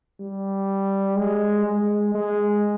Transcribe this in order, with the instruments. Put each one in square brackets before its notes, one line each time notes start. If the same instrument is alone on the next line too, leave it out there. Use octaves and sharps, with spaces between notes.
[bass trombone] G3
G#3
G#3
G#3